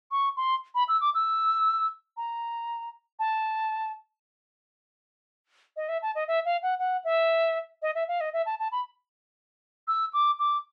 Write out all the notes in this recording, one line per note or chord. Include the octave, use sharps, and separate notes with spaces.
C#6
C6
B5
E6
D6
E6
A#5
A5
D#5
E5
A5
D#5
E5
F5
F#5
F#5
E5
D#5
E5
F5
D#5
E5
A5
A5
B5
E6
D6
D6